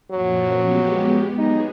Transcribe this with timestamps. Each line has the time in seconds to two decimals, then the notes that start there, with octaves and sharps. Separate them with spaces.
0.11 F#2 A#2 F3 F#3
0.62 G#3 B3 G4
1.38 F#3 B3 D#4 G#4